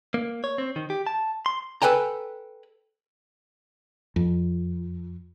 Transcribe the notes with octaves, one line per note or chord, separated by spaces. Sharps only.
A#3
C#5
C4
D#3
G4
A5
C6
A4 B4 G5 G#5 A#5
F2